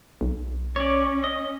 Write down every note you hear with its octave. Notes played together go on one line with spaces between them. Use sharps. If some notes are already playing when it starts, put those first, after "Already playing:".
B1
C#4 C#5 D5
D#5